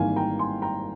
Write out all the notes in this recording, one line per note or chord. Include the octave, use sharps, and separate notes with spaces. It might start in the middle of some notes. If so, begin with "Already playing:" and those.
Already playing: G#1 G#2 E3 G3 A#3 F5 G#5
G5 A#5
G#5 C6
G5 A#5